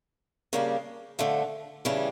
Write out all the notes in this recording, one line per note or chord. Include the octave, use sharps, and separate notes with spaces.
C#3 G3 A#3 D4
D3 F3 A3
C#3 E3 G3 D4